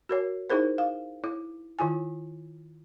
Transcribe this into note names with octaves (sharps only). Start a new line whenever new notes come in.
F#4 A#4 C#5
D#4 E4 G#4 A#4 C5
F5
E4
D#3 E4 F4 G#5